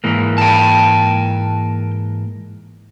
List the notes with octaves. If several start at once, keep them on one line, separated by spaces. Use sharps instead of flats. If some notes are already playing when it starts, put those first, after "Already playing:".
G#2 E3 A#3
G5 A5